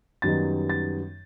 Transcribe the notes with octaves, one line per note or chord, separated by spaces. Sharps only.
F#2 D#3 G3 B3 D#4 A6
A6